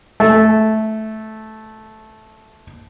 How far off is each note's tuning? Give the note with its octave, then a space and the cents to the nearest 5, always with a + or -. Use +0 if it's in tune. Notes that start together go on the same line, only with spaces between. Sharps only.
A3 -10